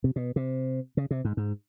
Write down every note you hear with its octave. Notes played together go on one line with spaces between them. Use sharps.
C3
B2
C3
C#3
C3
G#2
G#2